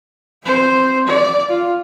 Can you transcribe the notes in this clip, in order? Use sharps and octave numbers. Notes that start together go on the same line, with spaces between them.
C4 C5
D5
F4